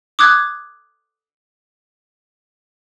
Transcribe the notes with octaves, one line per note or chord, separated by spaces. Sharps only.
D6 D#6 F#6 G#6